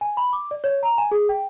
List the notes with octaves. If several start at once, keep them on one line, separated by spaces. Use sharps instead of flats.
G#5
B5
D6
D5
C#5
A#5
G#5
G#4
G5